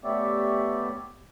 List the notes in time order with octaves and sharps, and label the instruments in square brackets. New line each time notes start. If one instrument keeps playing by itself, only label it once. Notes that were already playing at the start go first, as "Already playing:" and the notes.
[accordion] A3 B3 G4 C#5 D5 E5